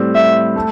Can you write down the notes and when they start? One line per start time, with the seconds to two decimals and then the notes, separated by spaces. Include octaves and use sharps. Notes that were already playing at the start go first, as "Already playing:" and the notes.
Already playing: A2 G3 C4
0.15 E5
0.56 A3